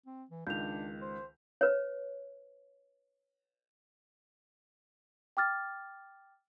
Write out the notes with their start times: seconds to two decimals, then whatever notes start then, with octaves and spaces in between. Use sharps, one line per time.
0.06 C4
0.31 E3
0.47 C#2 D#3 D4 G6 F7
1.02 C5
1.61 B4 C#5
5.37 G5 D6 F6 A6